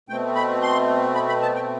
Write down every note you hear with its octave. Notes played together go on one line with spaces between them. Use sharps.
B2 A3 C4 G5
B5
C6
B5
B5
A5
G5